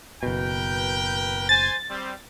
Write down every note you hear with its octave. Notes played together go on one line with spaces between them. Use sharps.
F#1 B2 A#4 B4 G5
C5 G#5 A6
G3 C4